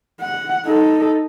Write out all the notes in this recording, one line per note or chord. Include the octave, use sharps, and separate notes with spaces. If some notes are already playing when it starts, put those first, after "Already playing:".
F#5
D#4 A4